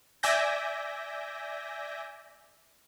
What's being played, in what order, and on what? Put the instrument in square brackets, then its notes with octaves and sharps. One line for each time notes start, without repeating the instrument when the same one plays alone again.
[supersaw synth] D5 E5 G#5 G6 A#6